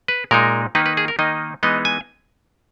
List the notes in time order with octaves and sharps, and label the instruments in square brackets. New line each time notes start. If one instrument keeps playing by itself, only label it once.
[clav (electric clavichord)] B4
A#2 G#3 D#4 A#4
D#3 A#3 D#4 B4
B4
G#4
A#4
D#3 A#3 D#4 D#5
E3 G#3 B3 D#4 D#5
G#5